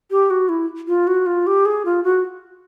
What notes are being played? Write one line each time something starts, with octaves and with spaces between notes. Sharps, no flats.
G4
F#4
E4
F4
F#4
F4
G4
G#4
F4
F#4